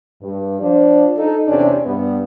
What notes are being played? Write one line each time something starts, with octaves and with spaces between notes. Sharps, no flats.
G2
F3 D4
D#4 A4
E2 C3 C#4 D4
G2 B3